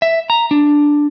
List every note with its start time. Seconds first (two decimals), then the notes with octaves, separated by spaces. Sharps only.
0.02 E5
0.30 A#5
0.51 D4